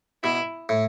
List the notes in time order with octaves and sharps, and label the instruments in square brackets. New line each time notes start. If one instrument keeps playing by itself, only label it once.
[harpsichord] B2 [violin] E4
[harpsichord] A2